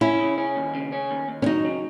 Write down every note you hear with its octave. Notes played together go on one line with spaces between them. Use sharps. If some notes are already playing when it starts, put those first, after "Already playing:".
C#4 E4
C#3
C#4
D#2
C#3
C#4
D#2
D#2
C#4
F#3 D#4
C#3